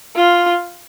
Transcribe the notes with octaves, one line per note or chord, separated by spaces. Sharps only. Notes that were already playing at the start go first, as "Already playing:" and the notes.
F4